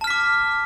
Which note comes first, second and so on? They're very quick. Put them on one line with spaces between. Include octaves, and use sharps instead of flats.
A5 F6 B6 D6